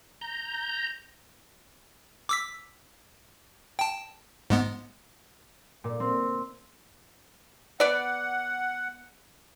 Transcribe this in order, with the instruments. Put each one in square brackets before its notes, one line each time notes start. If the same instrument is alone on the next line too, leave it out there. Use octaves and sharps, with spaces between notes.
[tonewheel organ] A#5 G6
[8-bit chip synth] D6 E6 B6
G5 A5
G#2 G#3 B3
[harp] A#2
C4
[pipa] B3 D5 [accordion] F#5